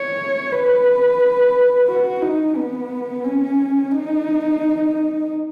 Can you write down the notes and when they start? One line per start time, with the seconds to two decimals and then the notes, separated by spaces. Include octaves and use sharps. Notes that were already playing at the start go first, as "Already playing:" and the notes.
Already playing: C#5
0.52 B4
1.88 F#4
2.22 D#4
2.56 B3
3.25 C#4
3.92 D#4